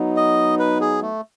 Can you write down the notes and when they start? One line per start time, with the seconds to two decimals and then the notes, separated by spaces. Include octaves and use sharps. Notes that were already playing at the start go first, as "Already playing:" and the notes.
Already playing: F#3 B3 D#4
0.17 D#5
0.59 B4
0.81 G#4
1.02 A3